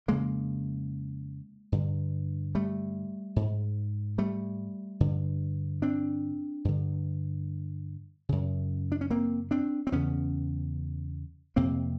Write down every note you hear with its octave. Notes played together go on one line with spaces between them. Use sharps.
F2 C#3 G#3 A#3
G2 D3
G3 A3
G#2
G3 A3
G2 D3
C4 D4
G2 D3
F#2 C#3
D4
C#4
A#3 C4
C4 D4
C4
E2 C#3 B3 C#4
F2 C3 A#3 C4